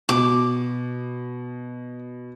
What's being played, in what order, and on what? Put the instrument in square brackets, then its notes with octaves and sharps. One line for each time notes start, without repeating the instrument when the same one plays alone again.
[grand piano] B2 [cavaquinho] D6